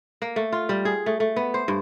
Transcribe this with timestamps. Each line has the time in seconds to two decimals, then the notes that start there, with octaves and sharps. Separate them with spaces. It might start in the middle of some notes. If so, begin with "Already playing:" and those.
0.22 A#3
0.36 A3
0.53 F4
0.69 G3
0.85 G#4
1.06 A3
1.20 A3
1.36 B3
1.54 C5
1.68 G2